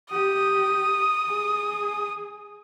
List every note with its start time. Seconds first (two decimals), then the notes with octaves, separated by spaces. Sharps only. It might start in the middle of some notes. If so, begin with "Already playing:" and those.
0.11 G4 D#6
1.27 G#4